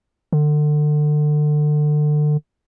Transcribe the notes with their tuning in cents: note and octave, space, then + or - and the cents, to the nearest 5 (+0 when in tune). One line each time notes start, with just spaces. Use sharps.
D3 +30